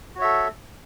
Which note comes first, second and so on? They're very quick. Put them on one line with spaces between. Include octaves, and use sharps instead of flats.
F#4 C#5 E5 A4